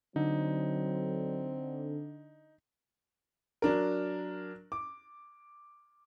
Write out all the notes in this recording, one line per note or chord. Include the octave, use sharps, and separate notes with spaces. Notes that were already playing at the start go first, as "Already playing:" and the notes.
D3 F#3 C4 D#4
F#3 D4 A#4
D6